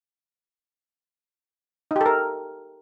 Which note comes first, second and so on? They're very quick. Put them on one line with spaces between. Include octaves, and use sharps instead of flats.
D#4 G4 A4 A#4